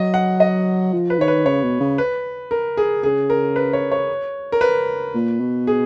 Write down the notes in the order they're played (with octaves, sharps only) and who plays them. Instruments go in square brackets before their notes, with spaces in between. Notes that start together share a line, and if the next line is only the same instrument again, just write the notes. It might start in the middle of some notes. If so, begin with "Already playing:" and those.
Already playing: [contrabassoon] F#3 [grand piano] D#5
[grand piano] F#5
D#5
[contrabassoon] F3
[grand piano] B4
[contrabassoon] D#3 [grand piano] C#5
[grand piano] B4
[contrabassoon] C#3 [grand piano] C#5
[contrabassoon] B2
C#3
[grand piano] B4
A#4
G#4
[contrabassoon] C#3 [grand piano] G#4
[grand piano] A#4
B4
C#5
C#5
A#4
B4
[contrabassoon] A#2
B2
[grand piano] G#4